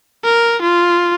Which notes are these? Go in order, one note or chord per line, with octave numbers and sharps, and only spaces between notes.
A#4
F4